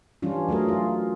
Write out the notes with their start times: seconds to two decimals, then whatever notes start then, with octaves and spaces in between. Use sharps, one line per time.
0.22 E3 G3 C#4 D4 F4
0.49 F#3 A3 G#4 A#4
0.68 F4